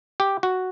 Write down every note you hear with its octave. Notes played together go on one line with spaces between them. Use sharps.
G4
F#4